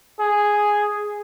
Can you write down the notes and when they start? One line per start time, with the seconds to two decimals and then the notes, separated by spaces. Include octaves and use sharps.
0.20 G#4